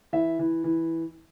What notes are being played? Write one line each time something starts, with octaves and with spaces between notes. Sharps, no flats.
E3 E5
E3
E3